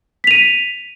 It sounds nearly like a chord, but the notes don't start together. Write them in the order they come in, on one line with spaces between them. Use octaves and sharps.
B6 F7 D#7